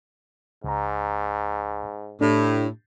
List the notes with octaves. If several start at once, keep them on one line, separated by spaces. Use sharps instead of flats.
C#2 G#2 A#5
A2 D4 G4